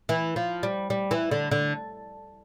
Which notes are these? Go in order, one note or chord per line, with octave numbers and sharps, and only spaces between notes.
E3
F3
G3
G3
E3
D3
D3